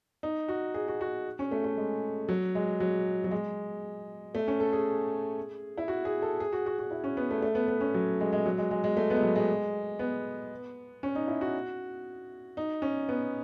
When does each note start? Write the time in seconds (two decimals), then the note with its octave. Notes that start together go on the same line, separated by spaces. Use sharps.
0.23 D#4
0.48 F#4
0.74 G#4
0.88 F#4
1.01 F#4
1.39 C#4
1.51 A3
1.64 A3
1.77 G#3
2.29 F#3
2.55 G#3
2.80 F#3
3.24 F#3
3.31 G#3
4.35 A3
4.48 C#4
4.60 A4
4.73 G#4
5.78 E4
5.88 F#4
6.05 G#4
6.22 A4
6.40 G#4
6.52 F#4
6.66 F#4
6.79 F#4
6.91 E4
7.04 C#4
7.17 B3
7.30 A3
7.42 A3
7.55 B3
7.68 B3
7.81 C#4
7.94 F#3
8.20 G#3
8.33 G#3
8.46 F#3
8.58 G#3
8.71 G#3
8.84 G#3
8.97 A3
9.10 B3
9.17 G#3
9.22 F#3
9.36 G#3
9.99 B3
11.03 C#4
11.15 D#4
11.28 E4
11.41 F#4
12.57 D#4
12.82 C#4
13.09 B3